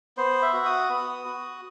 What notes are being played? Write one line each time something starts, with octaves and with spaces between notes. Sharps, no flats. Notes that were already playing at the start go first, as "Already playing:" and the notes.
B3 C5
E5
F#4
D#6
B3
F#4